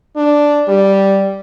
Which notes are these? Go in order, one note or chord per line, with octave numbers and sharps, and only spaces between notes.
D4
G3